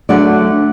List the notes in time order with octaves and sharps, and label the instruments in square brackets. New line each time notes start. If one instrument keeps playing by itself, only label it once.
[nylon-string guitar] D2 D3 F#3 D5 F#5